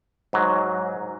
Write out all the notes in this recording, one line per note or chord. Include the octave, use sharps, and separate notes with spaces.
G#2 F#3